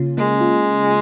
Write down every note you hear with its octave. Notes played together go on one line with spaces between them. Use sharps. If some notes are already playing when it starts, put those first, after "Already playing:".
Already playing: C#3 A#3 C#4 F4
G#3 A#3
F4